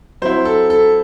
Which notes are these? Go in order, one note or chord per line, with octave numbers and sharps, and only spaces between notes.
F#3 C4 E4 C5
A4
A4